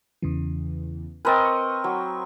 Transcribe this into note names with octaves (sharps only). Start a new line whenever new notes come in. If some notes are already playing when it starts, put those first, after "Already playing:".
E2 C#3 E3
C4 A#4 B4 D#5 G#5 A6
C#6
F#3